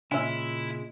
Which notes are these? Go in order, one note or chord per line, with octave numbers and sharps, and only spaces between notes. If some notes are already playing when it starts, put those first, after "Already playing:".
A#2 C#3 G#3 C#4 E4 E5